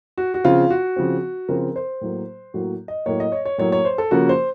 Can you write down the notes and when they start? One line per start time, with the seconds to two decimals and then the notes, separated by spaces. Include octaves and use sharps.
0.18 F#4
0.34 F#4
0.44 C#3 F3 C4 F4
0.70 F#4
0.96 C#3 F3 C4
1.48 C#3 F3 C4 A#4
1.76 C5
2.01 A2 F#3 A#3
2.54 A2 F#3 A#3 F#4
2.88 D#5
3.06 A2 F#3 A#3 C#5
3.20 D#5
3.32 C#5
3.45 C#5
3.58 A2 F#3 A#3 C#5
3.72 C#5
3.85 C5
3.98 A4
4.11 C#3 F3 A#3 C#4 F#4
4.29 C5